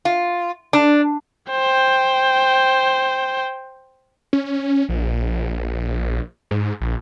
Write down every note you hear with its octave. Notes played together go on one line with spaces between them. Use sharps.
F4
D4
C5 G5
C#4
A#1
G#2
A#1